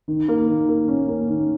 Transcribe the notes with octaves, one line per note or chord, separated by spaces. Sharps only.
D#3
A#3
D#3
A#3
C#4
A#3
D#3